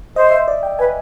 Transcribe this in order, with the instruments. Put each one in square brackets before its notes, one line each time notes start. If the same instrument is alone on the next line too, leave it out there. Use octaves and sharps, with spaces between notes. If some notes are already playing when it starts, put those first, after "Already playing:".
[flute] C5 [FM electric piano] D#5
[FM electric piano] E5
D5
G5
[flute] B4 [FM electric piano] G#5